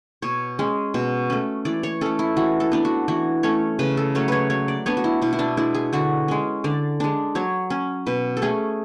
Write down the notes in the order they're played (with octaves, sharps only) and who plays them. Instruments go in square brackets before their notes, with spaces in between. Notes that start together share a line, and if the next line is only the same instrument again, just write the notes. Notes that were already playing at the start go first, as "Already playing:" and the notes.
[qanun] B2 C#5
G#3 C#4
B2
A3 C#4
E3 D5
C#5
A3 C#4 A4
E4
E3 F#4
A4
B3 D4
F#4
E3 F#4
A3 C#4 C#5
C#3 B4
A4
F#3 A3 C#4 C#5
B4 C#5
F#3 C#5
D5
B3 D4 C#5
F#4
E4
B2 E4
E4
D4
G#3 D4 E4
G#4
D3 F#4
G#3 C#4
D3 D5
G#3 D4
F#3 C#5
C#4
B2 B4
A4
A3 C#4 G#4